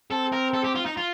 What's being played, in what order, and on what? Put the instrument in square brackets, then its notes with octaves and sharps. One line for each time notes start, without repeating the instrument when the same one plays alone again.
[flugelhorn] C4 [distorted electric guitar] A4
[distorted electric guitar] A#4
A4
G4
F4
D#4
F4